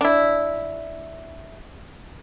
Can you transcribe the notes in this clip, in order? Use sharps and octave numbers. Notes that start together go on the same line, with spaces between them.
D4 E4